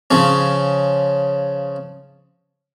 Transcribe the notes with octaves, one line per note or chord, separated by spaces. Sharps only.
C#3 F3 C#4